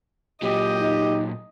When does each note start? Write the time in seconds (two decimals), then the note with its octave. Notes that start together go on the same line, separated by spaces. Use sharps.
0.42 A#2 F#3 G4 D#5
0.81 D#4